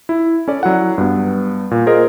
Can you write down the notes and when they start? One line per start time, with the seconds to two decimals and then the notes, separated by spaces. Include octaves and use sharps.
0.09 E4
0.48 C#4 A4 D5
0.63 F#3 E4 F#5
0.98 G2 B3
1.71 A#2
1.86 F4 G#4 A#4 C5 D#5